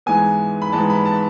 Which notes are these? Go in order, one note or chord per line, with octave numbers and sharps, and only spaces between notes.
G#2 E3 G#3 B3 G#5
B5
G#2 E3 G#3 B3 A5
B5
A5